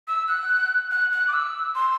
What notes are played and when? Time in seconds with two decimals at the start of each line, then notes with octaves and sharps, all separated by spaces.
0.08 E6
0.28 F#6
0.91 F#6
1.12 F#6
1.28 D6
1.33 E6
1.75 C6